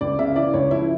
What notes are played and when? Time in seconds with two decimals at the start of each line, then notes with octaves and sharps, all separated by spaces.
0.01 C#2 D5
0.19 C#3 E5
0.36 E3 D5
0.54 C#2 C#5
0.71 F3 E4